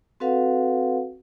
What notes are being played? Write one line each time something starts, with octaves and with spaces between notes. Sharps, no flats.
C4 F#4 A4 B4 F5 F#5